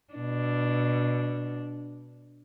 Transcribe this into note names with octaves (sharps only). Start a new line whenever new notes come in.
B2 D4